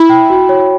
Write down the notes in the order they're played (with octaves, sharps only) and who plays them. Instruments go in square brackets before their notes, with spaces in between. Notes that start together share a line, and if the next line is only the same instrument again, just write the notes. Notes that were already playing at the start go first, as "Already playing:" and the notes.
Already playing: [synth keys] E4 [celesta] B5
[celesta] G5
F#4
C#5